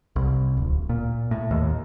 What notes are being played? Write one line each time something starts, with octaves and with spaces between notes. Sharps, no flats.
C2
D1
A#2
A2
D#2